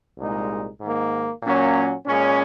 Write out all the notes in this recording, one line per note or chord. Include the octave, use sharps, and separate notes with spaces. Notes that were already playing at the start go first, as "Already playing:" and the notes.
C2 A#2 G#3 D#4
G#2 D#3 A#3
A#2 F#3 A#3 C#4
A#2 G#3 C#4